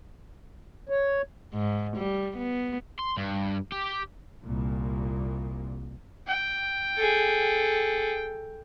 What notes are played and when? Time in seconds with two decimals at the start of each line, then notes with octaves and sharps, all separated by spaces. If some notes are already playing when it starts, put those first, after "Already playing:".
0.89 C#5
1.53 G#2
1.97 G3
2.37 B3
2.99 C6
3.18 G2
3.72 G4
4.42 C2 A#2
6.27 G5
6.98 G#4 A4